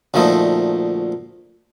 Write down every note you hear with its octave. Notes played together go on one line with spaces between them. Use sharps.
D2 A#2 F3 A3 D#4